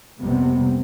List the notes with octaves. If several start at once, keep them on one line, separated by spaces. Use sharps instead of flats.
A#1 F2 C3 G3 B3 C4